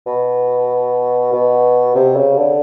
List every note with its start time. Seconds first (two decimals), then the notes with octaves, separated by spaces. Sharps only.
0.06 B2
1.32 B2
1.95 C3
2.16 C#3
2.37 D3